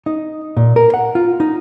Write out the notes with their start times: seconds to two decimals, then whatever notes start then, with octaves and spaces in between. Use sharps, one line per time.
0.06 D#4
0.57 A#2
0.76 A#4
0.94 F#5
1.15 F4
1.40 D#4